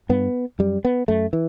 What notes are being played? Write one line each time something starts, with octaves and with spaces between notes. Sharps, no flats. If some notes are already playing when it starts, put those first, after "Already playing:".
G2 B3
F#2 G3
B3
F#2 A3
E3